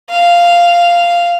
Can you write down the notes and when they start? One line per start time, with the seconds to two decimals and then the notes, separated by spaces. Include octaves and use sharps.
0.10 F5